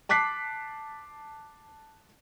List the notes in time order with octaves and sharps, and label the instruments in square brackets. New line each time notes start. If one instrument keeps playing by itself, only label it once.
[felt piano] A5 D6 F#6 B6 C7